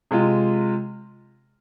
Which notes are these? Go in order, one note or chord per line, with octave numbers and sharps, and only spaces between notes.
C3 G#3 F4